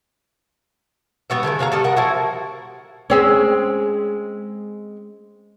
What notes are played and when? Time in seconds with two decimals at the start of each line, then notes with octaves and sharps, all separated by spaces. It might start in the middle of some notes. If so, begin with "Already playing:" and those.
1.30 G3 B3 F#4 E5
1.43 D3 D#3 G#3 E4
1.59 C3 F#4 F5 A#5
1.72 G3 A4 D#5
1.84 A#4 F#5
1.97 F3 E4 F#4
3.10 G#3 C4 C#4